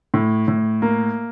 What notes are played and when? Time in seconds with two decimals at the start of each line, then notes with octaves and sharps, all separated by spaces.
0.14 A2
0.48 A2
0.82 A#3